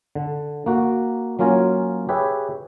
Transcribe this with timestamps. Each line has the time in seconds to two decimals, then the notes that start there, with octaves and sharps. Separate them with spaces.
0.15 D3
0.66 A#3 F#4
1.39 F#3 A#3 C#4 F4 G#5 A#5
2.09 G4 G#4 B4 C#5 E5